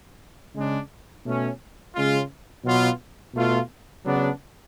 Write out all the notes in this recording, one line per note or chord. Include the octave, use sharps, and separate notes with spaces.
C#3 G#3 D4
B2 A3 C#4
C#3 G#3 C#4 F4
B2 F#3 B3 F4
B2 A3 F4
C#3 F#3 B3 D4